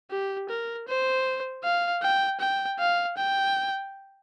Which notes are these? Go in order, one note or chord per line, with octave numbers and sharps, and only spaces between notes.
G4
A#4
C5
F5
G5
G5
F5
G5